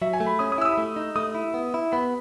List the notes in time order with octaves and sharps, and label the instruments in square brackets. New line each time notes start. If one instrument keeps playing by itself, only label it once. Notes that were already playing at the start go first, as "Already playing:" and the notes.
[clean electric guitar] F#3 [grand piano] E5
[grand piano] G#5
[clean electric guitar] A3
[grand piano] B5
[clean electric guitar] C#4 [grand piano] D#6
[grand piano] D#6
[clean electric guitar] E4 [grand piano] E6
[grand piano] D#6
[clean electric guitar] A3
D#4
[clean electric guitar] A3 [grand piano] D#6
[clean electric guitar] E4
B3
E4
[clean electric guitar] B3 [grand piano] B5